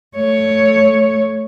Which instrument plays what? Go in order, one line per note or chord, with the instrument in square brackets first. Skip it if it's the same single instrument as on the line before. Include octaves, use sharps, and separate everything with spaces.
[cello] A3 C#5